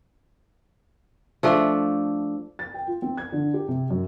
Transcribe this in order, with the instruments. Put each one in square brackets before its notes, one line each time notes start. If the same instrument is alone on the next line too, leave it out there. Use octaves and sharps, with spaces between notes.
[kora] F3 A3 D4
[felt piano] A6
G5
F4
C4
G#6
D3
G4
C3
F#2